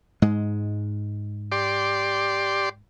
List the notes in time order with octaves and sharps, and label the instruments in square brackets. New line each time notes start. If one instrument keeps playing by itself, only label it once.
[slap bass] G#2 G#3
[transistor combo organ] G4 D5 C6